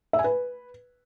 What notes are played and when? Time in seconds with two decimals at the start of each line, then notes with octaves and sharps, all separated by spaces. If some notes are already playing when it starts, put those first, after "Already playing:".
0.13 E5
0.19 G#5
0.24 B4